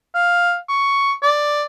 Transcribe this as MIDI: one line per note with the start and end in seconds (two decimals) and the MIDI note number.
0.15 0.56 77
0.69 1.13 85
1.22 1.64 74